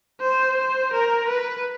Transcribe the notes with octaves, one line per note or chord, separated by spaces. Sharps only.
C5
C5
A#4
B4